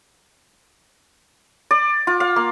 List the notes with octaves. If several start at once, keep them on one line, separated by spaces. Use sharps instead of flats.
D5
F4
F5
A#3